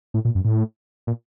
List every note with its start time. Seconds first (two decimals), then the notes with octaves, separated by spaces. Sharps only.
0.14 A2
0.25 A#2
0.35 F#2
0.45 A2
1.07 A#2